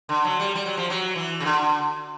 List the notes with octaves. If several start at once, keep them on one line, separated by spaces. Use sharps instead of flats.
D3
F#3
G3
G3
F#3
F3
F#3
E3
C#3
D3